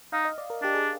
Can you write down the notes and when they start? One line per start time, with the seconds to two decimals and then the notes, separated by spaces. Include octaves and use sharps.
0.13 D#4 F5
0.25 D#5
0.38 D5
0.50 A#4
0.62 D4 G4
0.75 G#4